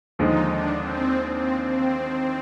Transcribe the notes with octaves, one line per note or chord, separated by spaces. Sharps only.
D#2 D3 F3 G#3 D#4
D4
C4
C4
C4